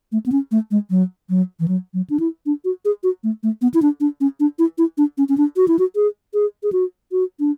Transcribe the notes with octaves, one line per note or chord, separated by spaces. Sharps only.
A3
B3
C#4
A3
G#3
F#3
F#3
E3
F#3
F#3
D4
E4
D4
F#4
G#4
F#4
A3
A3
B3
E4
D4
D4
C#4
D4
E4
E4
D4
C#4
C#4
D4
F#4
E4
F#4
G#4
G#4
G#4
F#4
F#4
D4